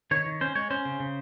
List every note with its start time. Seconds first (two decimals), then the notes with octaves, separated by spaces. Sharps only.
0.11 D#3 C#5
0.26 D#3
0.41 C#4 C5
0.55 G#3 C#5
0.70 C#4 C5
0.85 C#3
1.00 C#3